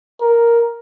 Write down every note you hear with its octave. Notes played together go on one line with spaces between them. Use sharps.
A#4